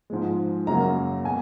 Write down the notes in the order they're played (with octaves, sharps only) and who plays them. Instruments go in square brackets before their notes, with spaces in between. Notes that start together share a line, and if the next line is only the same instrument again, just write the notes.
[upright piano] G#2 F3 G#3
F#2 C#3 F#3 A#3 A#5
B2 G#3 G#5